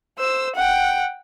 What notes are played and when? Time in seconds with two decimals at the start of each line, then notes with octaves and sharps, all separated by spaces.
0.18 C5 E6
0.56 F#5 G5